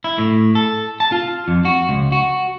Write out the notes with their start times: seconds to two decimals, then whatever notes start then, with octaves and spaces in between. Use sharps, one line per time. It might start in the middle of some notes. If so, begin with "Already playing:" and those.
0.04 E4
0.18 A2
0.55 A4
1.00 A5
1.12 F4
1.48 F2
1.65 F#4
1.89 C#2
2.12 F#4